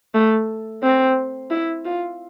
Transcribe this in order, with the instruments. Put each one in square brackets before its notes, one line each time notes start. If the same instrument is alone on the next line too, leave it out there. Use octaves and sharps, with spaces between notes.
[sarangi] A3
C4
E4
F4